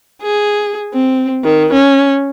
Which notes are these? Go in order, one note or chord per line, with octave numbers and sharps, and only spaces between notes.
G#4
C4
D#3
C#4